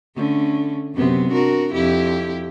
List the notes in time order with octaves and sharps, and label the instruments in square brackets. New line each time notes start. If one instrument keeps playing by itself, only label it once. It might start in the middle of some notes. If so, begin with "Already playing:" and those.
[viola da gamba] D3 A3 C#4
F#2 C3 B3
D4 F#4 A#4
F2 E4 G4